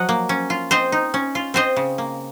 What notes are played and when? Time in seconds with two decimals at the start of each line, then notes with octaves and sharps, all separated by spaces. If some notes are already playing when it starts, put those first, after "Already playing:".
Already playing: F3 F#3 D#5 F#5
0.09 A#3
0.29 C#4
0.50 F4
0.71 C4 C5 D#5
0.92 D#4
1.14 C#4
1.35 F4
1.54 C4 C5 D#5
1.76 C#3
1.98 A#3